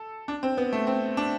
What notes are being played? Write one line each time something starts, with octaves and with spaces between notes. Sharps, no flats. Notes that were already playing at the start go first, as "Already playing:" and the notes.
Already playing: A4
D4
C4
B3
A3
C4
D4